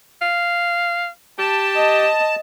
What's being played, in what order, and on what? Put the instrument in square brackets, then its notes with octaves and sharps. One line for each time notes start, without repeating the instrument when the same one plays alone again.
[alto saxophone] F5
[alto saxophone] G4 [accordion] A5
[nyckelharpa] D#5